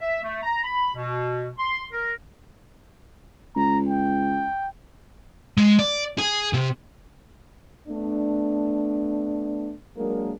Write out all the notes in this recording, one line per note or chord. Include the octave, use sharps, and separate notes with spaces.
E5
A3
A#5
B5
B2
C6
A#4
C#2 A#5
G5
G#3
D5
G#4
C3
A3 B3 D4
F#3 G#3 A#3 D4 A#4